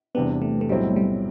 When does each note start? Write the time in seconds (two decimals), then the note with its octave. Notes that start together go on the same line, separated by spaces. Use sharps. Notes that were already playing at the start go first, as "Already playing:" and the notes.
0.15 E2 C3 G3 B3 D4
0.42 A3
0.61 A3
0.69 B1 A2 F#3 G3 C4 E4
0.96 G3